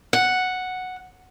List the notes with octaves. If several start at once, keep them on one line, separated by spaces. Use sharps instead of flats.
F#5